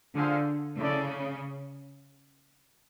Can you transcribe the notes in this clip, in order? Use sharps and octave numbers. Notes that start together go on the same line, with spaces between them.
D3 F4 G#4 C5 F5
C#3 E4 A4 D5